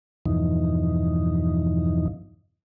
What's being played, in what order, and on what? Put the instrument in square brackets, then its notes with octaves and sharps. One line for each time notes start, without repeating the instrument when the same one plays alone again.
[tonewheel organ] E2 G2 B2 E3 F3 D#4